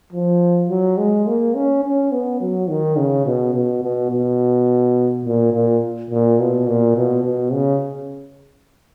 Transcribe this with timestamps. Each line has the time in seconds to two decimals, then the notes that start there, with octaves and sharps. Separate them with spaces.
0.13 F3
0.69 F#3
0.98 G#3
1.27 A#3
1.54 C#4
1.84 C#4
2.12 B3
2.41 F#3
2.69 D#3
2.97 C#3
3.26 B2
3.55 B2
3.83 B2
4.11 B2
5.25 A#2
5.53 A#2
6.10 A#2
6.39 B2
6.67 A#2
6.96 B2
7.24 B2
7.52 C#3